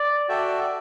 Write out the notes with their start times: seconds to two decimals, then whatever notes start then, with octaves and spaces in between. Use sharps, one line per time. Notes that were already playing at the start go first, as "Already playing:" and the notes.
Already playing: D5
0.29 F#4 A4 E5 G5